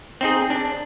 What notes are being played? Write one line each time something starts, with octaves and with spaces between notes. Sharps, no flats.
C4 D#4 G#4
D4